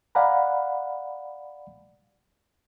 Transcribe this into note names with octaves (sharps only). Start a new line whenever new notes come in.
D5 F5 F#5 G#5 A#5 B5